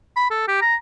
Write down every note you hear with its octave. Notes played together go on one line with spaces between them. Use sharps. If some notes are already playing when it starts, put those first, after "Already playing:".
B5
A4
G4
A#5